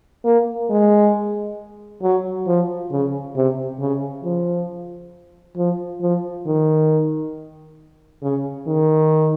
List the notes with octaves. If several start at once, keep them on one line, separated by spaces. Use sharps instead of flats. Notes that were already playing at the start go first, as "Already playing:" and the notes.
A#3
G#3
F#3
F3
C#3
C3
C#3
F3
F3
F3
D#3
C#3
D#3